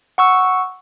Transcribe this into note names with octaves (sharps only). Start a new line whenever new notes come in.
F#5 C#6 E6